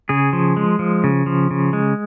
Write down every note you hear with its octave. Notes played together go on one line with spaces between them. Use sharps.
C#3 G#4
F3
G#3
F3
C#3
F3
C#3
G#3